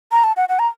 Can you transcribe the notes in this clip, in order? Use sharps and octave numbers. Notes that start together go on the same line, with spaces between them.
A#5
A5
F#5
F#5
A#5